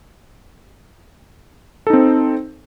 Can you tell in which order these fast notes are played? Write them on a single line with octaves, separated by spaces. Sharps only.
A4 D#4 C4